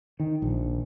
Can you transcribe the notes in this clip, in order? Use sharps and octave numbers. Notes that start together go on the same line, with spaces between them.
D#3
A#1